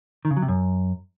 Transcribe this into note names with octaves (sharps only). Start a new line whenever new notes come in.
D#3
C#3
F#3
C3
F#2